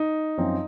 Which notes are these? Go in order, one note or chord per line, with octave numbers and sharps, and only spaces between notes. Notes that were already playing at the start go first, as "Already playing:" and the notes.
Already playing: D#4
F#2 F3 C4